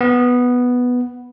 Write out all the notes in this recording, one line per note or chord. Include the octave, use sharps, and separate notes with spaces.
B3